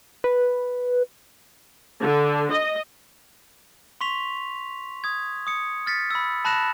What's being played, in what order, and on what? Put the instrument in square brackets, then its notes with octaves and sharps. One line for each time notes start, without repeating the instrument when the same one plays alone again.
[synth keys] B4
[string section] D3
D#5
[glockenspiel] C6 C#6 B6 F7
D#6 G#6
D#6 C#7
F6 A6 B6 C#7
B5 E6
A5 B5 F#6 A#6 E7